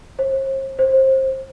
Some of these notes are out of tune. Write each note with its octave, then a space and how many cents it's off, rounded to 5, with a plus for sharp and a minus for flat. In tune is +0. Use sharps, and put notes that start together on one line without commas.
C5 +45
C5 +20